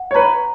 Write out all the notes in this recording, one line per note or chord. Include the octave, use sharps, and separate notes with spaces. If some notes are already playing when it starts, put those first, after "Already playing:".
Already playing: F#5
C#5
B4 A#5